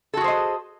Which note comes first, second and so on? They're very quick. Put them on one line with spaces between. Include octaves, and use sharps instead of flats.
A4 F#4 G#4 C5 D#5